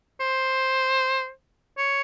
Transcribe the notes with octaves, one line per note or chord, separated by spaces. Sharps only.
C5
C#5